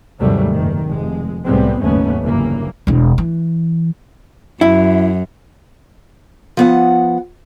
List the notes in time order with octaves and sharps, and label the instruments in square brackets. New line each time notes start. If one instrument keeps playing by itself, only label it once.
[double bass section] D#2 G#2 C3 F#3 G3 A3
F#1 D#3
F1 G#3
C2 A2 G3 G#3 B3 C4
F#1 D#2 G#2 A3 B3 C#4
G1 F#2 C#3 E3 A#3
[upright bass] E1 E2
E3
[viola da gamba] F#2 [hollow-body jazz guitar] E4
[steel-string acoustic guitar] F3 B3 F#5